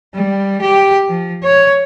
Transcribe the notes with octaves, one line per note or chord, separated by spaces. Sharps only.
G3
G4
F3
C#5